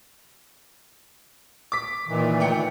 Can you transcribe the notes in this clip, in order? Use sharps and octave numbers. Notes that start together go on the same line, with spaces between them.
D6 B6
A#2 D#3 E3
D2 G5 C#7